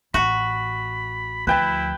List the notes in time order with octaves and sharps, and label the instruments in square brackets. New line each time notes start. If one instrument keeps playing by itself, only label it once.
[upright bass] A1 [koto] F#4 [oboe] B5
[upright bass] D2 F3 [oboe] E4 [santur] B4 G5 A5